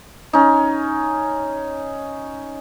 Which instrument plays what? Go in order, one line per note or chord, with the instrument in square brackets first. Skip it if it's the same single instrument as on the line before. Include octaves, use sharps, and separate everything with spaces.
[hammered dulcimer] C#4 D#4